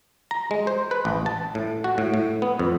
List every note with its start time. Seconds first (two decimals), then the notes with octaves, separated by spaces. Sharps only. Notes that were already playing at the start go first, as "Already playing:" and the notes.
0.31 A#5
0.51 G#3
0.67 C5
0.91 B4
1.05 A1
1.26 A5
1.55 A2
1.84 F#4
1.98 A2
2.14 A2
2.42 B3
2.59 F2